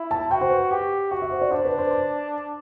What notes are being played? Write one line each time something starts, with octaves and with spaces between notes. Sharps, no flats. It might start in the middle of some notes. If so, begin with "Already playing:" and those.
Already playing: E4
A5
F#4 G5
C5
B4
G4 G5
F#4 F#5
E5
C5
D5
D4 C5
B4
C5
C5